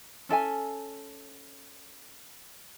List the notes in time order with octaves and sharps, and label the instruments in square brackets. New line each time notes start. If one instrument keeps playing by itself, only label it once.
[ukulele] C#4 A4 E5 G#5